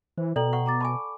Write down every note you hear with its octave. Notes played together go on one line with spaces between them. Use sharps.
E3 C5
B2 A4 D5 G5 A#5 F#7
F#5 C#6
A#5 D6 A6
G#5 A5 B5 C#6 D6